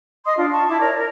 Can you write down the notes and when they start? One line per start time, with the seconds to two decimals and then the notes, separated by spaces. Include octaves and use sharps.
0.25 D#5 C6 D#6
0.37 D4 F4
0.51 A5 C#6
0.68 E4 A5 D6
0.81 A#4 C#5 D5
0.96 A#4